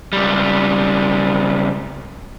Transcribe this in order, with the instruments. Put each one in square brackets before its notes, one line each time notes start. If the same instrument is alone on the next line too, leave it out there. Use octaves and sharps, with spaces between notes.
[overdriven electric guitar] C#2 G3